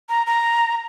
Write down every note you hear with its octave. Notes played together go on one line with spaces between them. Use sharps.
A#5
A#5